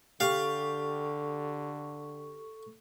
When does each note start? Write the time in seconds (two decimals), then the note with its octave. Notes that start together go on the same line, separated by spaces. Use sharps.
0.20 D3 G4 A4 F5 C#6